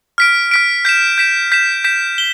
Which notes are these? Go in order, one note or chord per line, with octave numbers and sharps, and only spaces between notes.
F6 B6 D7
F6 B6 D7
G6 B6 E7
G6 B6 E7
G6 B6 E7
G6 B6 E7
G7